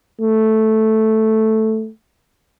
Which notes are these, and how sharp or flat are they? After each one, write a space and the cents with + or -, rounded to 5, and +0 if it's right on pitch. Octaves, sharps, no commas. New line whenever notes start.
A3 -5